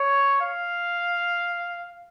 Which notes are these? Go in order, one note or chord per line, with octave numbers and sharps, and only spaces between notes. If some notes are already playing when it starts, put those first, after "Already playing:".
Already playing: C#5
F5